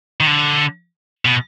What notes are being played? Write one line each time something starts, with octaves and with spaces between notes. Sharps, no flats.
D#3
D3
B2